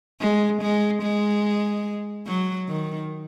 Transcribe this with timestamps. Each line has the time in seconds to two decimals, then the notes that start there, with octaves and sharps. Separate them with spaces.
0.21 G#3
0.61 G#3
1.02 G#3
2.27 F#3
2.68 D#3